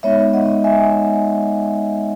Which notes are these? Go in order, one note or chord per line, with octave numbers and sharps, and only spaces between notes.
G#3 B3 D#4 C#5 E5
D#5 F#5
E5 G#5